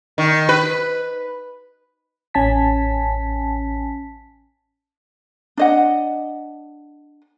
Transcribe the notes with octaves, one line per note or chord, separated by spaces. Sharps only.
D#3
B4
A1 C#4 G#5 A5 B6
D4 D#5 F#5